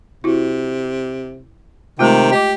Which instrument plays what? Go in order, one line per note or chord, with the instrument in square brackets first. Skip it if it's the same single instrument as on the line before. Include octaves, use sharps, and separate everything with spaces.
[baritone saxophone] C3 [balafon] E4 F#4
[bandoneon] C3 G5 [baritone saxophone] D#3 [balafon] G#3 A3 F4
[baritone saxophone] G4 [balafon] D#5 D6